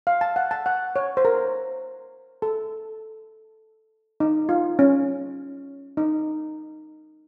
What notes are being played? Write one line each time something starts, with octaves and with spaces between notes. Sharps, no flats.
F5
A5
F#5
A5
F#5
C#5
C5
A#4
A4
D#4
F4
C#4
D#4